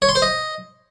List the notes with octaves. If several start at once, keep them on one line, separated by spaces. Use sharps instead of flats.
C#5
C6
C5
D#5